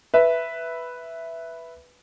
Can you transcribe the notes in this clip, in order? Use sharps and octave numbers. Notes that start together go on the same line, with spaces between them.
B4 E5